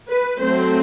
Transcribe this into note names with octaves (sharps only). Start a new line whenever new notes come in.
B4
F#3 A3 C4 C5